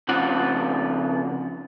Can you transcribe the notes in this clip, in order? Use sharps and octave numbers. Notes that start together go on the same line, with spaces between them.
F2 C#3 F4 F#5